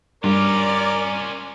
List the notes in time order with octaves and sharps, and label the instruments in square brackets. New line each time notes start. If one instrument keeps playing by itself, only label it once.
[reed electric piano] G2 G3 [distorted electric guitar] C#4 F4 [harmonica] A#4 [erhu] D5